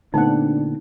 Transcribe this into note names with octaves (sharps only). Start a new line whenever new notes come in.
A#2 D3 A3 B3 C4 D4 D#4 F#5